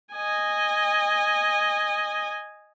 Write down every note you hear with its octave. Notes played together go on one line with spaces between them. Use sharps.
D#5 G#5